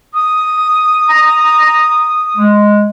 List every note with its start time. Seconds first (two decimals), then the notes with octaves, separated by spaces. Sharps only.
0.14 D#6
1.09 A#5
2.37 G#3